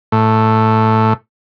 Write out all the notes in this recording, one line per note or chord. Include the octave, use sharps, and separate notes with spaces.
A2